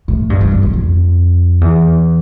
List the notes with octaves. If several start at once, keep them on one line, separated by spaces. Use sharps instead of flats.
A2
G2
G2
E2
F2
F2
E2